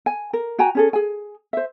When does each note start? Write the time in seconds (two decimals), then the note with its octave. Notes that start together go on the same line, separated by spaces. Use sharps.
0.06 G#5
0.33 A#4
0.59 F#4 G5 G#5 A#5
0.75 C#4 G#4 A4
0.93 G#4 G#5
1.53 C5 E5